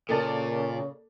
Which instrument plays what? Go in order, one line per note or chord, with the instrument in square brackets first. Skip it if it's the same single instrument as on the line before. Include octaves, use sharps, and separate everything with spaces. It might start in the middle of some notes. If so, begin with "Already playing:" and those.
[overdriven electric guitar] A#2 [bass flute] C#3 [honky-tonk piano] A#3 D5 A5 [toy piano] A4